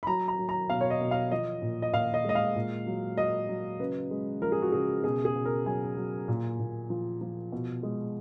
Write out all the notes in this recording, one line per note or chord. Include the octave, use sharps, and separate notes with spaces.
B5
F#3 A#5
A#5
F#3
A#5
B2 F5
C#5
D#5
B2
F5
F3 D#5
A#2
D#5
A#2 F5
D#5
G#3 D#5
F5
A#2
F#3
F#3 D#5
F#3
C#3 B4
G#3
F3 A#4
G#4
F#4
C#3 G#4
B2 G#4
G#4
B2
A#4
F#3 G#5
F#3
A#2
A#2
F3
F3
B2
G#3